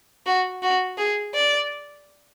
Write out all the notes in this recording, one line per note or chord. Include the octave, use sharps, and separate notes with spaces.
F#4
F#4
G#4
D5